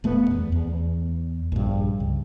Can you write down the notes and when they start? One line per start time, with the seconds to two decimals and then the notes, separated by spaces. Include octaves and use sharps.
0.04 D#1 A3 B3
0.31 E2
0.52 E2
1.52 A#1 G2
2.00 C#2